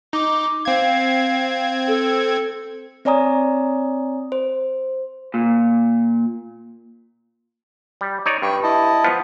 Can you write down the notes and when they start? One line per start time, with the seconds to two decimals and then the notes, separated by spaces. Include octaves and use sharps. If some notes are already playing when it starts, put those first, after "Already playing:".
0.13 D#4 D6
0.65 C4 F5 G#6
1.87 A4
3.05 C4 C#5 D5 G#5 A#5 D#6
4.32 C5
5.34 A#2
8.01 G3
8.26 D#4 C#5 D5
8.42 G2 G5 C#6
8.63 E4 D#5 A5
9.04 F3 B3 F4